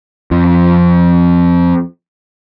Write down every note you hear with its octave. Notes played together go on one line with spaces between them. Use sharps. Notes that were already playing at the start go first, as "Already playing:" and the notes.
F2 F3